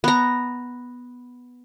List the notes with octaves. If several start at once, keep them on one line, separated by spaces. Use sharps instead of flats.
B3 A#5